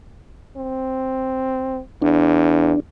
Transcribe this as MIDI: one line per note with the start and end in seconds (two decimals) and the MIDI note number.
0.57 1.80 60
2.02 2.73 40
2.02 2.80 62